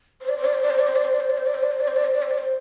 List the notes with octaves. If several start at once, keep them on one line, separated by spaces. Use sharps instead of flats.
C5
D5
C5
D5
C5
D5
C5
D5
C5
D5
C5
D5
C5
D5
C5
D5
C5
D5
C5
D5
C5
D5
C5
D5
C5
D5
C5